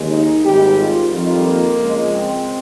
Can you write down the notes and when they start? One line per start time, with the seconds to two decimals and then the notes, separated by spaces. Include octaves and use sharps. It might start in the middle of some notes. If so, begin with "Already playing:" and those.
Already playing: D#2 C#3 G#3
0.11 D#4
0.44 G#1 G#2 G3 G4
0.79 F4
1.12 F2 D#3 G3 F4
1.46 A#3
1.79 C#2 C#3 F3 G#3
2.14 C4